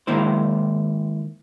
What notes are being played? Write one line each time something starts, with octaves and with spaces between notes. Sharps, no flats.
D#3 G#3 A#3 E4 C5